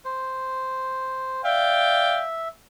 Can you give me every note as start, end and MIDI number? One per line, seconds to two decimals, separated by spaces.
0.05 1.42 72
1.45 2.23 74
1.45 2.48 76
1.45 2.23 77
1.45 2.23 79